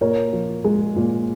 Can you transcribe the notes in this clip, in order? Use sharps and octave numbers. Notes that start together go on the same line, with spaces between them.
A#2 A#4 C#5
F3
G#3
A#2